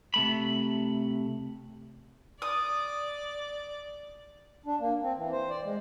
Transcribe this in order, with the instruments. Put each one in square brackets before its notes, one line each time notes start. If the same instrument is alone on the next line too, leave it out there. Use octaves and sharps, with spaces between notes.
[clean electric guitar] C3 A3 B5
[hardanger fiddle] D5 [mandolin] D#6
[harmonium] D4
A#3
C4
E3
C5
D5
G#3